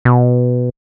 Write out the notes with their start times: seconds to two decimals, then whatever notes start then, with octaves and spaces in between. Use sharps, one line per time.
0.05 B2